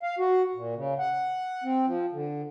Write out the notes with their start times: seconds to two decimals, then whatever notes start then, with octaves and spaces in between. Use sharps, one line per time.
0.03 F5
0.19 F#4
0.55 A#2
0.76 C#3
0.99 F#5
1.64 C4
1.86 F3
2.13 D3